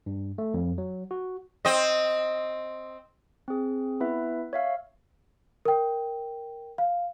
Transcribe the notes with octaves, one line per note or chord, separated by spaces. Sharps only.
G2
A3
F2
F#3
F#4
C4 D#5
C4 G#4
B3 E4 B4 E5
C#5 E5 F5
A#4 G5
F5